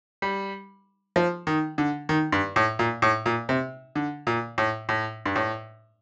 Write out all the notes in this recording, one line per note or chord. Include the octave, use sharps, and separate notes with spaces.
G3
F3
D#3
D3
D#3
G2
A2
A#2
A2
A#2
C3
D3
A#2
A2
A2
G2
A2